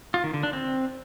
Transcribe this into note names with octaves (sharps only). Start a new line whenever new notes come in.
F4
D#3
D3
D4
C4